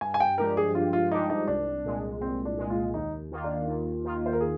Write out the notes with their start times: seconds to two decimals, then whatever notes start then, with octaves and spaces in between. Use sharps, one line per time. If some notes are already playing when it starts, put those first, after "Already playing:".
0.01 G2 G#5
0.14 G#5
0.20 G5
0.38 F3 G#3 D4 G4 A#4
0.57 G#4
0.75 G2 F4
0.93 F4
1.11 F3 G#3 D4 D#4 G4
1.30 D#4
1.47 C2 D4
1.85 A#2 G#3
2.21 C2 C4
2.45 D4
2.58 A#2 G#3
2.70 F4
2.94 D#2 D#4
3.31 D#3 A#3 F4
3.44 D4
3.68 D#2
4.04 D#3 A#3 F4
4.26 C5
4.33 A#4
4.41 G#4